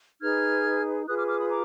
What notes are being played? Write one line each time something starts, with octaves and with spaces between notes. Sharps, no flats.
D#4 G#4 B4 F6 G#6
F4 G#4 B4 D#6 F#6
D6 F6
D6 F6
B5 D#6
A#5 D6